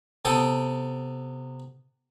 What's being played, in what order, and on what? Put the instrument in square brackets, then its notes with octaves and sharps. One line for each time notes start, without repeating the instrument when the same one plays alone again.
[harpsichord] C3 B3 A4 G5 D#6